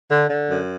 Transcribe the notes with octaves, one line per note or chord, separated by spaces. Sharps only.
D3
D3
F#2